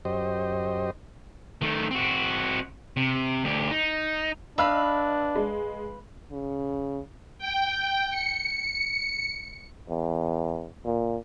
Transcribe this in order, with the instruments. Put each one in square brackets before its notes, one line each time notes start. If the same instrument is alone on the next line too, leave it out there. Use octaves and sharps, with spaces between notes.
[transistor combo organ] F#2 G4 C5 D#5
[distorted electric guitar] D#3 A3
C4 F#4
C3
D2 G4
D#4
[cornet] D4 [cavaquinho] B4 F5 B5 [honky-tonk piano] D#5 E6 F6
[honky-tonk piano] G#3
[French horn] C#3
[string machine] G5
C#7
[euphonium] E2
A#2